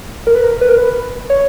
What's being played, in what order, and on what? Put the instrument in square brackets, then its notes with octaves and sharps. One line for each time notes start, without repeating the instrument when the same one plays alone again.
[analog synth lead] A#4
B4
A#4
B4
A#4
B4
C#5